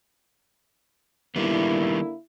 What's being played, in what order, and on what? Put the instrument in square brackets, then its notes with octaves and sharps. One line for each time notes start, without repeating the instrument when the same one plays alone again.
[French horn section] D3 A#3 E4 [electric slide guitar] D#3 G3 B3